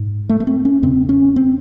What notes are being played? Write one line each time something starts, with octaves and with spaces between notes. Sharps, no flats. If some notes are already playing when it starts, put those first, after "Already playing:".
Already playing: G#2
A3
A3
C4
C#4
E2 C#3 C4
C#4
C4